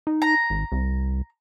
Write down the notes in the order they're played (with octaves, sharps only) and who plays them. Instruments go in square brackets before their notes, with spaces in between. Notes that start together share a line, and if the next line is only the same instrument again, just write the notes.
[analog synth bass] D#4
[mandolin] A#5
[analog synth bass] G#1
C2